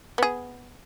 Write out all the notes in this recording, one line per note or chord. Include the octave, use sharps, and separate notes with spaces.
B3 G#4